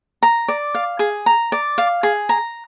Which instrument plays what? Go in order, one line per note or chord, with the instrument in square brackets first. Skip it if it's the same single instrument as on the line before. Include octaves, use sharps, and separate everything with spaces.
[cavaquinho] A#5
D5
F5
G#4
A#5
D5
F5
G#4
A#5